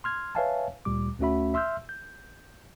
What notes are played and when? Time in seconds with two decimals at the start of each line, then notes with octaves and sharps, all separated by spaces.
0.04 C6 F6 G#6
0.35 B4 C#5 E5 F5 G#5 A5
0.85 D2 A#2 G3 D6
1.20 D2 A3 C#4 F#4 E5 B5
1.54 E5 C6 E6 F6 G6
1.89 G6